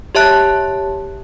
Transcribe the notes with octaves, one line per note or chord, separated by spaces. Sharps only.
G4 C#5 E5 A5 F#6